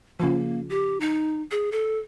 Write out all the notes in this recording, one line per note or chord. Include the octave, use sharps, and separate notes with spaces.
C#3 F3 A#3
G4
D#4
G#4
A4